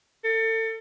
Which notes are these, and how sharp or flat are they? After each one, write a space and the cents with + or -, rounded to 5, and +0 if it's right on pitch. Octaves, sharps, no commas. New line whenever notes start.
A4 +30